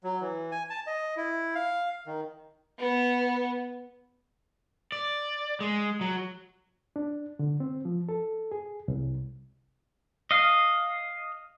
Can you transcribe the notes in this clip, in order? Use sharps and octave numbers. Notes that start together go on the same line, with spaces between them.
F#3
E3
G#5
A5
D#5
E4
F5
D#3
B3
D5
G#3
F#3
D4
D3
C4
F3
A4
G#4
C2
D#5 F5